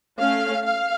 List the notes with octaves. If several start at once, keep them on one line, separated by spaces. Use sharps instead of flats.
A3 C#4 F5
F5